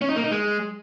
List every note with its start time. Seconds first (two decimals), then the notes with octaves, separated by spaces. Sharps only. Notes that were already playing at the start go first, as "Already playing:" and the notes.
0.02 C#4
0.09 D#4
0.16 A#3
0.24 D#4
0.31 G#3